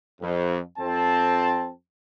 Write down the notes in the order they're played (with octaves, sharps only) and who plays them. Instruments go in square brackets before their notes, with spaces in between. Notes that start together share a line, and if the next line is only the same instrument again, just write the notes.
[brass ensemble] F2
F2 C4 A5